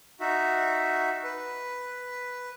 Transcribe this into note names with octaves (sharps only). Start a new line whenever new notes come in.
D#4 F#4 E5
B4